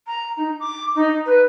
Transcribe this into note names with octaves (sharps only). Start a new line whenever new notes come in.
A#5
D#4
D6
D#4
B4